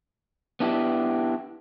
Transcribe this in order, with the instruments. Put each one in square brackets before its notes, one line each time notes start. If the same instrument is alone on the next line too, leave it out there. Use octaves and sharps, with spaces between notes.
[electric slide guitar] B3 D4 E4 G4